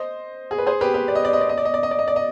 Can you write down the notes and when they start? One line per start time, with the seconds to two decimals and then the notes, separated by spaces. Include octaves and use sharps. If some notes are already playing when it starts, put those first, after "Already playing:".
Already playing: C5 D#5
0.51 G#4
0.58 B4
0.66 G#4 C5
0.81 G4 B4
0.94 G4 B4
1.08 D5
1.15 D#5
1.25 D5
1.33 D#5
1.41 D5
1.49 D#5
1.58 D5
1.65 D#5
1.74 D5
1.83 D#5
1.91 D5
1.99 D#5
2.08 D5
2.16 D#5